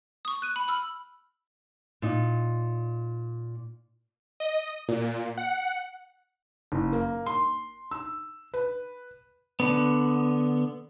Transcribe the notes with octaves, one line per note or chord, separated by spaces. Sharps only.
C#6 D#6
F#6 D#7
B5
B5 E6 F6 F#7
A#2 D#4
D#5
A#2
F#5
F#1
A#3
C6
E6
B4
D3 B3